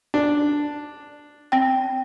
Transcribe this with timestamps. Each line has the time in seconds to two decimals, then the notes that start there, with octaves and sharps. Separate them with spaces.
0.14 D4
1.52 C4 G5